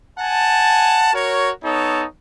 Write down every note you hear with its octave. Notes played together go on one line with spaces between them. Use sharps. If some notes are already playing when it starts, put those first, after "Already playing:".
F#5 G#5 A5
F#4 A#4 C#5
B3 D#4 A4 C#5